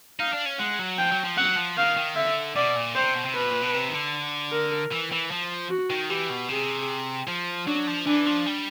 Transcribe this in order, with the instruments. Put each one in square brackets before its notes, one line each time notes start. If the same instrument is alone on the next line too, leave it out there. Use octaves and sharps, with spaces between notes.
[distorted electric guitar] D#4 [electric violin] F5
[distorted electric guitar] D4
C#4
[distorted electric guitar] G#3 [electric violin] F#5
[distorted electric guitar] F#3
[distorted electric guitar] F3 [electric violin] G5
[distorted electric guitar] F#3
F3
[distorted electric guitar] F#3 [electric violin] F#5
[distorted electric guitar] F3
[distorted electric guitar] D#3 [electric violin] F5
[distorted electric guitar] D#3
[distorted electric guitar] D3 [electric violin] E5
[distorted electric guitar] B2 [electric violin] D5
[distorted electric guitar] A#2
[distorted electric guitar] C3 [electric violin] C5
[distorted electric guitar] B2
C3
[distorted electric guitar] B2 [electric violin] B4
[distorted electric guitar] A#2
B2
C3
D#3
D3
[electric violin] A#4
[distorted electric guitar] E3
E3
F3
[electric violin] F#4
[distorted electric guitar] D#3
[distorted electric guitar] E3 [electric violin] G4
[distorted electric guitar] B2
[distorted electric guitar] C3 [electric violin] G#4
[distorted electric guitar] F3
[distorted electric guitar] F#3 [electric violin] D4
[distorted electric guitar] F3
[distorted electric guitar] E3 [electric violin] D4
[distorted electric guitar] F3
G3